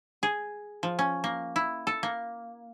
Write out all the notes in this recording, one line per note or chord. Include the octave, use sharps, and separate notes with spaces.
G#4
F3
C#4
A#3
E4
A4
A#3